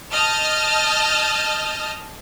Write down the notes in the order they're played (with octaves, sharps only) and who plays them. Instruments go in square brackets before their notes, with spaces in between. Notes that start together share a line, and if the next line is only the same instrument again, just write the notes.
[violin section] D#5 A5 D#6 F6 G6